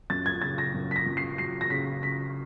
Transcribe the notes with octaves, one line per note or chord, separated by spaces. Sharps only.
F#2 A6
G#6
C#3 A6
A#6
F#2
B6
A#6
F#2
C7
F#3 C7
A#6
C#3 B6
C#3 B6